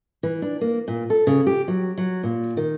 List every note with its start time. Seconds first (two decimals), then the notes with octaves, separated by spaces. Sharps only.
0.23 E3
0.42 D4
0.61 A#3
0.88 A#2
1.10 A4
1.27 C#3
1.47 G4
1.68 F#3
1.98 F#3
2.23 A#2
2.57 D#3